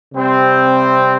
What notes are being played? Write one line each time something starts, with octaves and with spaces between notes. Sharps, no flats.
C3 G3 C4